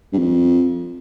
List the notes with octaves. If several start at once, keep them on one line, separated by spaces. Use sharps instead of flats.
G2
F2